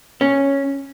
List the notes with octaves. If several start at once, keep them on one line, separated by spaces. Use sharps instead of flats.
C#4